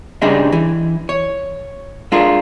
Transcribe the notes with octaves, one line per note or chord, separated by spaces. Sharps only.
G2 C#3 G3 G#3 D4 D#4
E3
C#5
G#3 D4 F4 A4 A#4